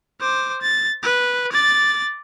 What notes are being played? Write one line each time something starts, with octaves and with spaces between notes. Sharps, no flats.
C5 D6
A6
B4
D5 A6